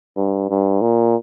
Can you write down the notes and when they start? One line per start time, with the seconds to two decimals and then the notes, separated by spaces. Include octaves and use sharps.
0.17 G2
0.49 G2
0.81 A#2